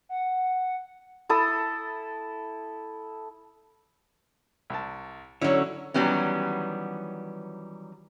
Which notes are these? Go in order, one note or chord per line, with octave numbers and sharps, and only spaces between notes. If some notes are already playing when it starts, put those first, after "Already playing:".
F#5
E4 A4 D#6
C2 A5
D3 F#3 C#4 E4 C#5
D#3 E3 F#3 G3 B3 C#4